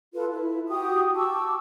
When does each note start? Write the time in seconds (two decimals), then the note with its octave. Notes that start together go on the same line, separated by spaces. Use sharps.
0.13 F4 A4 B4
0.31 E4
0.69 F#4 G4 G5 D#6
1.15 A5 C#6 D6 E6